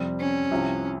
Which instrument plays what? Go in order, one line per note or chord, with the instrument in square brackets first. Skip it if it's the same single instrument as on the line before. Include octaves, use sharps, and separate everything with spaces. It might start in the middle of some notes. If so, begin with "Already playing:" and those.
Already playing: [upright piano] F2 C3 G3 C4
[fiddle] C#4
[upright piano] C2 C3 F3 C4 G4